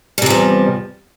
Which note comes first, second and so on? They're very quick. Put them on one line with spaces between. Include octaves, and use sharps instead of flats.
G3 C3 F3 E2